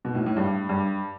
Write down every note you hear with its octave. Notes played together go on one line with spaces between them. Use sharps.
B2
A2
A2
G2
G2